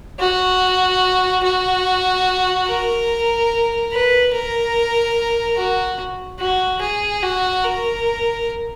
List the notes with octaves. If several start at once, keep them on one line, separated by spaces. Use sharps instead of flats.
F#4
F#4
A#4
B4
A#4
F#4
F#4
G#4
F#4
A#4